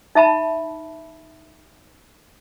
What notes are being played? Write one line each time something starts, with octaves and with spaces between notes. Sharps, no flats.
D#4 E5 A5 B5